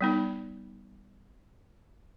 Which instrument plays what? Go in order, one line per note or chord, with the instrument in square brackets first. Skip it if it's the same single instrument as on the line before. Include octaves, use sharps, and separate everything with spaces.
[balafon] G3 B3 D#4